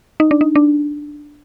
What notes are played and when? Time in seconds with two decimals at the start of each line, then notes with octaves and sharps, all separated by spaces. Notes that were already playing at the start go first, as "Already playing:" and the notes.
0.20 D#4
0.31 D4
0.41 D#4
0.55 D4